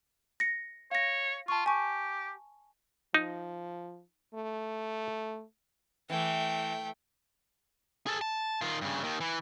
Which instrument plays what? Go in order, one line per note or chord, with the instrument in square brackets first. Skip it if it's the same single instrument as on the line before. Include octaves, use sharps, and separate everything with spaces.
[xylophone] A#6 C#7
[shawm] C#5 [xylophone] F5 A#6
[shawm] F4 [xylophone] A5 C#6
[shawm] G4 [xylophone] G#5 C#6
[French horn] F3 [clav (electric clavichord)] D#4
[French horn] A3
[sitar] E3 [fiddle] A3 G5
[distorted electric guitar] G#4 A4
A5
D#3 F4
G2 C#3
D#2 D#3
E3